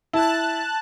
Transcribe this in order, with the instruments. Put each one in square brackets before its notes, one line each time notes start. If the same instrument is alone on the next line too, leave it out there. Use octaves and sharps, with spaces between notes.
[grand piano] E4 [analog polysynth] A5 F#6